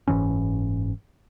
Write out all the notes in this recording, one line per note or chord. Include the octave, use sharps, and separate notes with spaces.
F#1 G#2 E3 C#4